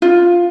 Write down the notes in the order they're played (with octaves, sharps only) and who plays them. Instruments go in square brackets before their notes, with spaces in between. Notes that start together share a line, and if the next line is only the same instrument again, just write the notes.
[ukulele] F4